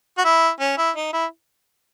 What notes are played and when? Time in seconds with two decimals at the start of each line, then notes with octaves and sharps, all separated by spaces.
0.18 F#4
0.25 E4
0.60 C#4
0.78 E4
0.96 D#4
1.13 E4